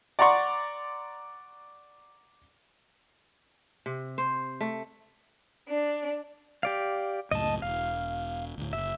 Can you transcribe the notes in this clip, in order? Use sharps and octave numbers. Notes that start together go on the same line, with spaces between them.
D5 F#5 A#5 C6 C#6
C3
C5
A3
D4
G4 D5 F5
C#2 F#2 A2 D#5 A5
E1 F5
D2 A2
F#1 E5